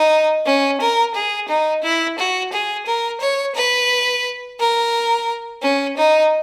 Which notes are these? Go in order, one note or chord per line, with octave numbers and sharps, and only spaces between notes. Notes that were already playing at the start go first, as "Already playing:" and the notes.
Already playing: D#4
C#4
A#4
G#4
D#4
E4
F#4
G#4
A#4
C#5
B4
A#4
C#4
D#4